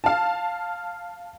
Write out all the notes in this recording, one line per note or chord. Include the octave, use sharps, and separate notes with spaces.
F5 A5